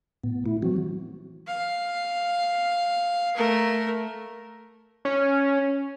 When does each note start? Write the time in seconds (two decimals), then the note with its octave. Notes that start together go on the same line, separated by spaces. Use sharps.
0.24 A2 B3
0.46 A3 E4
0.62 E3 F#3 C4 F#4
1.47 F5
3.36 A3 A#4
5.05 C#4